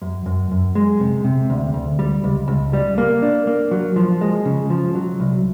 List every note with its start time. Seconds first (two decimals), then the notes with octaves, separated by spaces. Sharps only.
0.02 F#2
0.26 F#2
0.51 F#2
0.75 G#3
1.00 C3
1.24 C3
1.50 D2
1.74 D2
1.99 G3
2.24 C#2
2.48 C#2
2.73 G3
2.98 A#3
3.22 D4
3.47 A#3
3.71 F#3
3.96 F3
4.21 G#3
4.45 C#3
4.70 F3
4.95 F#3
5.20 C2